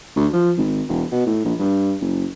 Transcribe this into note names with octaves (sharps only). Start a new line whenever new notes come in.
D2
F3
G#1
E1
B2
A2
A#1
G2
F#1